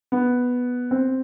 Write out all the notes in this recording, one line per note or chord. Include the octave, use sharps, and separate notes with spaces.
B3
C4